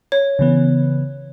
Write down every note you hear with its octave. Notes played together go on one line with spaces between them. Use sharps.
C#5
C#3 E3 B3